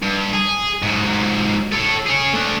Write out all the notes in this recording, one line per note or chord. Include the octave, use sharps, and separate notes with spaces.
G2
G#4
G#2 F#3
A4 C#5
G#4 C#5
A3 D4